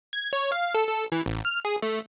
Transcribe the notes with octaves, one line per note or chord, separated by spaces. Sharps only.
G#6
C#5
F5
A4
A4
E3
A1
F6
G#4
A3